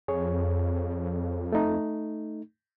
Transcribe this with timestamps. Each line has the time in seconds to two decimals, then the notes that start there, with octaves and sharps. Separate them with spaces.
0.08 F2 G#4 C#5
1.52 A3 D#4